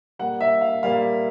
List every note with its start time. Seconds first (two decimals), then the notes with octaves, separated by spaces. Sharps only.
0.19 A#2 G3 A#3 F#5
0.41 E5
0.61 F5
0.83 A#2 G3 A#3 F5